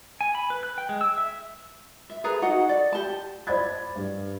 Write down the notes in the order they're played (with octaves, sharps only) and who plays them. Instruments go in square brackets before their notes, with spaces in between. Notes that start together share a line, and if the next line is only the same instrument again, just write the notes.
[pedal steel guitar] G#5
B5
B4
F#6
G5
G#3
E6
E5
[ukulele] E5
G#4 A4 B4 A#5
D#4 F#4 F#5
A4 D5
G4 A5
[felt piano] C5 D5 B5 G#6 A6
G2